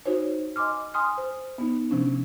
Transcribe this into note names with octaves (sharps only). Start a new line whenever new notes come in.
D#4 F#4 C5 C#5
D#5 G#5 C6 D6 F6
G#5 C6 D#6 F6
C5
B3 D#4
C3 F3 C#4 D4